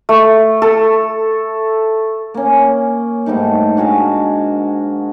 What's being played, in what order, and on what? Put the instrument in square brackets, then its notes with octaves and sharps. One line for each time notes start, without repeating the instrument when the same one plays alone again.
[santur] A3
A4
[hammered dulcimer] A#3 C#4
G#2 G3 A3 D#4
D4 F#4 G#4 F5